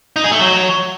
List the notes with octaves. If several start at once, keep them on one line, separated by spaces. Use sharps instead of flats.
D#4
G#4
A3
F#3